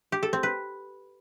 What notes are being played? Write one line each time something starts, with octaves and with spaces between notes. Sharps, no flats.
G4
A4
C4
B4